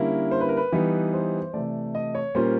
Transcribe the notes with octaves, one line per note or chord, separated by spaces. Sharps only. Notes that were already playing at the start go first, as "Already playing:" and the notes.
Already playing: D3 G3 A#3 C#4 E4 A#4
C5
B4
A#4
B4
E3 G3 B3 D#4
C5
C3 E3 A3 D5
D#5
C#5
A#2 G3 A#3 C#4 F4 C5